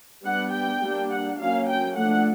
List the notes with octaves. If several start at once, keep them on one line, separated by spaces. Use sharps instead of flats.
G3 B3 D4 F#5
G5
G3 A#3 D4
F#5
F#3 A#3 C#4 F5
G5
F3 A3 D4 F#5